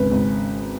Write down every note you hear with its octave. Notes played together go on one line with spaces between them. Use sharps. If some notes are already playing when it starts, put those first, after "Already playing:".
Already playing: G#1 C#3 B4
G#1